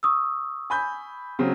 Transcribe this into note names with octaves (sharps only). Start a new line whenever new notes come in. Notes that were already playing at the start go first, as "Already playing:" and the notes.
C#6 D#6 E6
G#5 B5 G6
C#3 F#3 C4